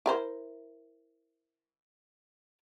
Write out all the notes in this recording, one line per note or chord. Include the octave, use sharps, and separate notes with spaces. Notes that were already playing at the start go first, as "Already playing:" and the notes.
E4 A#4 C5